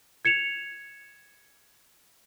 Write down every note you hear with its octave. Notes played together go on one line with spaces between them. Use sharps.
G#6 C#7 E7 F7